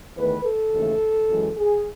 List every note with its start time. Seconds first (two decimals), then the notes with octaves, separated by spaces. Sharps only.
0.16 E2 D#3 A3 B4
0.45 A4
0.73 D#2 C#3 E3 A3
1.30 F#2 E3 G#3
1.57 G#4